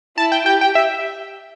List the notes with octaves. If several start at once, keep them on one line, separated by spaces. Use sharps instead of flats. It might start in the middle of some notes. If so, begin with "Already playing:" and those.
E4 A5
G5
G4 G5
G5
E5